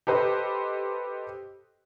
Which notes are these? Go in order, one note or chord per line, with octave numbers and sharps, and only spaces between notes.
G4 A4 B4 C5 D#5